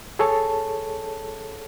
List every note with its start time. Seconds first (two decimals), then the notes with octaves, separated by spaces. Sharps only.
0.19 G#4 A4 C#5 A5